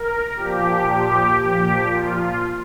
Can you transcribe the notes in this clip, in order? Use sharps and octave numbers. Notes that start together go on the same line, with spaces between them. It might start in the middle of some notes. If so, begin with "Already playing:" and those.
Already playing: A#4
A#2 F3 G4
G4
A#2 F3 G4
F4